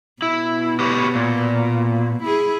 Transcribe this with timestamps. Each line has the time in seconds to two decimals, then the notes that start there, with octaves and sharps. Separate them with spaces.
0.22 B2 E4
0.80 G4 B4 C#5
1.15 A#2
2.23 E4 G#4